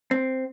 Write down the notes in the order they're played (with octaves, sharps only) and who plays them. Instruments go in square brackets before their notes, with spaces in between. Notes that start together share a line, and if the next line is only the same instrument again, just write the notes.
[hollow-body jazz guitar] C4